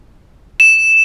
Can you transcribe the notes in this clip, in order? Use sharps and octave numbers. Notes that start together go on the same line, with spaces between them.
E7